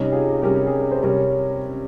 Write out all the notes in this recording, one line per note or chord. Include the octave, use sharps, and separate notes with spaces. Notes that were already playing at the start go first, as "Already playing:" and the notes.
Already playing: C3 G3 C#4 D#4 G4
F4 G#4
C3 G3 C#4 G4 A#4
G#4
A#4
C5
C3 G3 C#4 A#4 C#5